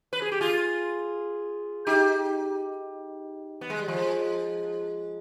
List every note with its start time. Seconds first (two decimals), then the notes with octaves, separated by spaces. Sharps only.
0.13 B4
0.22 G#4
0.32 G4
0.41 F4 G#4
1.87 D#4 G4
3.61 B3
3.70 G#3
3.79 G3
3.88 F3 G#3